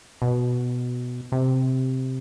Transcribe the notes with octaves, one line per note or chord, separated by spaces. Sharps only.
B2
C3